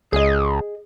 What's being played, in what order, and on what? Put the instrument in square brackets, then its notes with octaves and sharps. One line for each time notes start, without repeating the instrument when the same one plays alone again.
[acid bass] C#2 [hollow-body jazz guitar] G#4 D#5